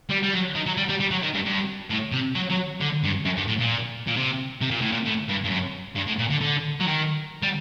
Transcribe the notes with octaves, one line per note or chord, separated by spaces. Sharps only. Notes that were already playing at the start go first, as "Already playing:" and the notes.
G3
G3
F#3
D#3
F#3
G3
G3
G3
F#3
D#3
G2
G2
A2
C3
F#3
F#3
D3
G2
F#2
G2
A2
A#2
A#2
C3
C3
A#2
A2
A#2
A2
G2
G2
F#2
G2
A2
A#2
D3
D3
F#3
D#3
G3